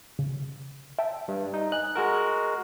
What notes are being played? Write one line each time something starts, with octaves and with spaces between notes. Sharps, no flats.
C#3
E5 G5 A5
G2
D#4
D#5 G#5 F#6
G#3 F#4 A#4